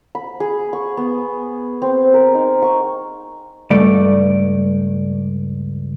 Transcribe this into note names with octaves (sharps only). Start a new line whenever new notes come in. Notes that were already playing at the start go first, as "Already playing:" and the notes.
B5
G#4
C#6
B3
C4
A#4
D#4
C#6
C#2 G2 A3 D5